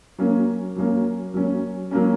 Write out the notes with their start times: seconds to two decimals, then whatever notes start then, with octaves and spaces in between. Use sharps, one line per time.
0.18 F#3 A#3 C#4
0.76 F#3 A#3 C#4
1.34 F#3 A#3 C#4
1.91 F#3 A#3 C#4